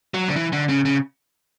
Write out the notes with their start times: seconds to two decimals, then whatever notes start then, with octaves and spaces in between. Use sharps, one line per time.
0.14 F#3
0.28 D3
0.36 E3
0.53 D3
0.69 C#3
0.85 C#3